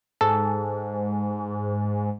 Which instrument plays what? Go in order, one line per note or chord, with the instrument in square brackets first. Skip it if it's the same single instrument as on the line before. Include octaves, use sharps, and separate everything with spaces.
[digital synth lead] G#2 [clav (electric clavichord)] A4